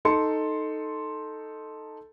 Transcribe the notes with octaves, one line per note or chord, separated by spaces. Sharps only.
D#4 A4 C6 C#7